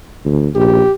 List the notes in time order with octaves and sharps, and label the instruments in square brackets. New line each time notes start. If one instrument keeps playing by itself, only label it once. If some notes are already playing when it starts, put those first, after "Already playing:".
[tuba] D2
[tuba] A#1 [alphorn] G4